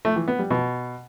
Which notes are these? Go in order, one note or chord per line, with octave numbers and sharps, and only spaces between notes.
A3
E3
B3
G3
B2